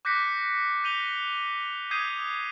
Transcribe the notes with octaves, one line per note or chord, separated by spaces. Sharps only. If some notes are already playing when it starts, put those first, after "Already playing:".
D6 F#6 G6 A#6 B6 C#7
G6 D#7 F7 G7
D#6 G6 G#6 C7 D#7